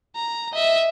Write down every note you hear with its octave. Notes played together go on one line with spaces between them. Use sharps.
A#5
D#5 E5